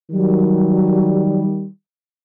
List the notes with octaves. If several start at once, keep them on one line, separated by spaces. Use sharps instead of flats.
D#3 F#3 G3